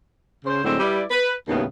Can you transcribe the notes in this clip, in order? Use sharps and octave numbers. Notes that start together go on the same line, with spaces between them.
C#3 C5
A2 D3 F#3 G#3 C4
G3 E4 B4 D5
B4
D#2 A2 C#3 G3 B3